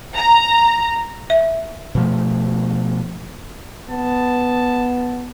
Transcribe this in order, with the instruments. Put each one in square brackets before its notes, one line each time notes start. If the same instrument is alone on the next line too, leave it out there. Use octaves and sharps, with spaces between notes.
[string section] A#5
[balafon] E5
[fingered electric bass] B2 F3 A3
[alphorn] B3 [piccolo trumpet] A5